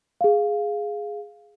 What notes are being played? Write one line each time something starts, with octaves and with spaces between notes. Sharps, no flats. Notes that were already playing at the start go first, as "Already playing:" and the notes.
G#4 F5